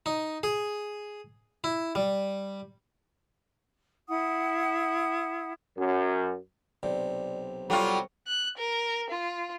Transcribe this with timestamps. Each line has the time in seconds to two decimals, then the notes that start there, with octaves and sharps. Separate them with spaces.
0.06 D#4
0.43 G#4
1.64 E4
1.95 G3
4.09 E4 F#5 D#6
5.76 F#2
6.83 B1 C3 D5
7.70 F#3 G3 F4 A4 G5 C#6
8.27 F#6
8.58 A#4
9.10 F4